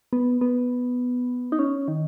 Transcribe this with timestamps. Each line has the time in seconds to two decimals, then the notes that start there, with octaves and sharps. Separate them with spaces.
0.13 B3
0.41 B3
1.52 D#4
1.59 C#4
1.88 D#3